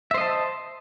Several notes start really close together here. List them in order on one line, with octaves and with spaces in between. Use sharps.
E5 C5 D#5 A5